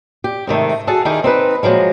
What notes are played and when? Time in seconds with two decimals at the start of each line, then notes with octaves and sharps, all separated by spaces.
0.24 G4
0.47 G#2 C3 D#3 A3
0.87 F#4 G#4 A4 A5
1.05 D#3 D#4 E4 G4 G#4 A#4
1.24 C4 D#4 B4
1.63 A#2 F3 F#3 G#3